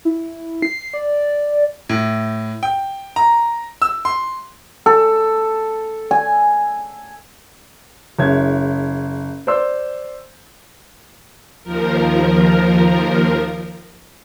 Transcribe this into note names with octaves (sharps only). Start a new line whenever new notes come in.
E4
C7
D5
A2
G5
A#5
E6
C6
A4
G#5
F#1 G#3 C#5 E5 G#6
C5 D5 C6 E6
D#2 F3 A#4